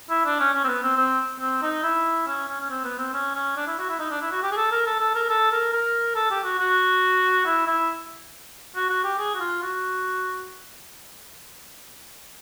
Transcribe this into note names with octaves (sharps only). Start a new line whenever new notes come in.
E4
D4
C#4
C#4
C4
B3
C4
C4
C4
D#4
E4
C#4
C#4
C#4
C4
B3
C4
C#4
C#4
D4
E4
F#4
E4
D#4
D4
E4
F#4
G4
G#4
A4
A#4
A4
A4
A#4
A4
A#4
A#4
A4
G4
F#4
F#4
E4
E4
F#4
F#4
G4
G#4
F#4
F4
F#4